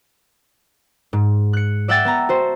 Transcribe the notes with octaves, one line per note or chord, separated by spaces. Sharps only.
G#2
F#6 C#7
D5 E5 F#5 G5 E6 A6
B3 A5 A#5
F#4 C5